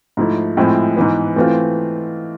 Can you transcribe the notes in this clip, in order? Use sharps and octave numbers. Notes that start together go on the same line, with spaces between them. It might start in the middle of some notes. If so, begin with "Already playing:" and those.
G#2 F3 A3 E4
A2 F3 G#3 C4 E4
G#2 E3 B3
E3 A3 C4 F4